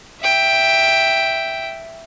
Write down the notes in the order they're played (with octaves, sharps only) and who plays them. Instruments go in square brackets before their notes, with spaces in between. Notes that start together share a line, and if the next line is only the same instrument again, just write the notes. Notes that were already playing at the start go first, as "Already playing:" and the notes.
[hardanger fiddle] E5 G5